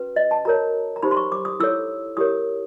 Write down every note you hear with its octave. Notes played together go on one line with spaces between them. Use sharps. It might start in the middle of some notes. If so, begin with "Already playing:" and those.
Already playing: C#4 F#4 B4
D#5
A5
F#4 A#4 C#5 A#5
A#5
D#4 G4 C5 B5
C6
C#6
D6
D#6
E4 A4 C#5 E6
E4 G4 A#4 C#5 D#6